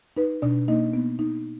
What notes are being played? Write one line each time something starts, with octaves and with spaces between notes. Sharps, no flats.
D#4 B4
B2 D4 D5
A#3 D#4 D#5
B3
D#4